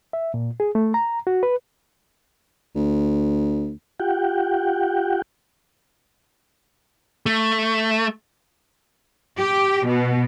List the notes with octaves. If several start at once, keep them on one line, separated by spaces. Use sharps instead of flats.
E5
A#2
G#4
A3
A#5
F#4
B4
D2
F4 G4 F#5 G5
A3
G4
B2